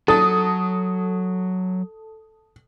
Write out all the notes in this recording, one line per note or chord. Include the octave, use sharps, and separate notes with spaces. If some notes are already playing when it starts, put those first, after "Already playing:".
F#3 A4 A5 D#6